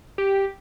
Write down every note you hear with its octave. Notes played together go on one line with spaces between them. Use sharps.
G4